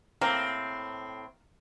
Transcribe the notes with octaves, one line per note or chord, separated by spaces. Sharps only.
A2 A#3 C4 G4 A#4